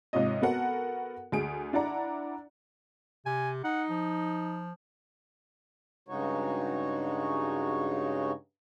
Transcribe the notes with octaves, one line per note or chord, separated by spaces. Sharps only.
G#2 C3 F4 C#5 D#5
B3 F#4 A4 A#4 F#5
D2 G#4 D7
D4 E4 D5 F#5 A#5
C3 G#5
D#4 F#5
F3
G2 C#3 G#3 D#4 F#4 C#5